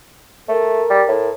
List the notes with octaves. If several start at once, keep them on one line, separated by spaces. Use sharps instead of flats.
A3 A#4
G3
A2